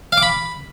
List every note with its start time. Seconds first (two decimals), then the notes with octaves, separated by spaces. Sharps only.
0.12 F5
0.17 D6
0.23 B5